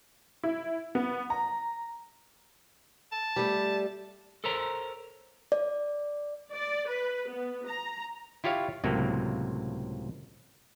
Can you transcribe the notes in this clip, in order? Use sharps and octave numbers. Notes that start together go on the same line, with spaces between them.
E4
B3
A#5
A5
G3 A3
A4 A#4 C5 C#5 A#5
D5
D5
B4
B3
A#5
E4 F4 G4 C#5 F5
C#2 A2 C3 F#3 A#3